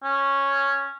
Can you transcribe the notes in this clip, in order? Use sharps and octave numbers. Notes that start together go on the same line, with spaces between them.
C#4